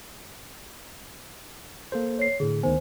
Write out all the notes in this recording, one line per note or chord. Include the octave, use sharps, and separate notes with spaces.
A#3 A4 C5
C#5 C7
A2 D3 G#4
D2 D#3 B3 C5 G#5